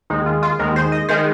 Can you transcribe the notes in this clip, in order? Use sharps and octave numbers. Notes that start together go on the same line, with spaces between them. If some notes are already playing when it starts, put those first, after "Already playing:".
D#2 D#3 G#3 D#4
F4
F4
D#2 D#3 G#3 A#4
C5
D#5
D#3 G#3 C5